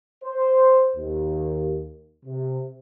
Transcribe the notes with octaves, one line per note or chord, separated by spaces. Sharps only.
C5
D#2
C3